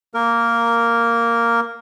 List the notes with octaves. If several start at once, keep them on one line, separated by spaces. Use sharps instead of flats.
A#3 A#4